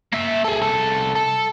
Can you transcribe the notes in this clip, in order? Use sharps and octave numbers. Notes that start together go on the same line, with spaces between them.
A#3 E5
G#4 A4
C2 A4
A4